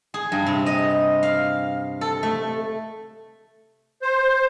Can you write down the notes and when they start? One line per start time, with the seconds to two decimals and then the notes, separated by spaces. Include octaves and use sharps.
0.14 G#4
0.32 G2
0.46 C3
0.66 D#5
1.23 F5
2.01 A4
2.23 A3
4.02 C5